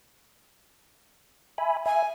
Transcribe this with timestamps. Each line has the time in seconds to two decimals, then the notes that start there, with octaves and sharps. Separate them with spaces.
1.58 E5 G#5 B5
1.86 E5 G#5